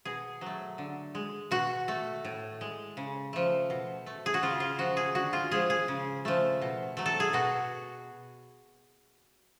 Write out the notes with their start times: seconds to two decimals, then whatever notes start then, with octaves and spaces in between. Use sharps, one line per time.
0.05 B2 G#4
0.41 F#3 A3
0.78 D3
1.15 G#3
1.51 B2 F#4
1.88 A3
2.25 A2
2.61 G#3
2.97 C#3
3.33 F3 A3
3.70 B2
4.06 A3
4.26 G#4
4.34 F#4
4.42 C#3 F4
4.60 F4
4.78 F3 G#3 F#4
4.97 G#4
5.15 D3 F#4
5.33 F4
5.51 F3 G#3 G#4
5.70 G#4
5.88 C#3
6.25 F3 A3
6.62 B2
6.97 F#3 A3
7.06 A4
7.20 G#4
7.33 B2 F#4